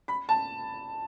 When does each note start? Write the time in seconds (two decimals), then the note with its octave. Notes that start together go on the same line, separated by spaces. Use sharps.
0.08 B5
0.29 A5